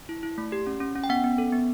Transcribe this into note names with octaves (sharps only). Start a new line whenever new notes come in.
E4
E4
A3
G4
C#4
C#4
C#4
G5
B3 F#5
B3
A4
B3